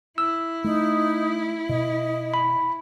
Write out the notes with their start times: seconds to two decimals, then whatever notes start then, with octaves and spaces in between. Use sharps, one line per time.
0.18 E4 E6
0.64 A3 D#4
1.69 B2 D#5
2.34 B5